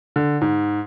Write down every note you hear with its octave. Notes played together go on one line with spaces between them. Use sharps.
D3
G#2